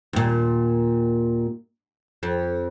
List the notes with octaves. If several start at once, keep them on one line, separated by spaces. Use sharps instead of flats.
D#2 A#2
F2